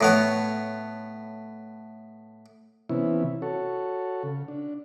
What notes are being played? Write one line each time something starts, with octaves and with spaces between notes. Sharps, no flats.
A2 B3 C#5
C3 E3 B3 C#4 E4
F#4 A4 C#5
C#3
D4